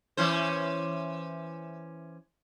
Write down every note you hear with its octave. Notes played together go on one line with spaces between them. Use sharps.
E3 C#4 C5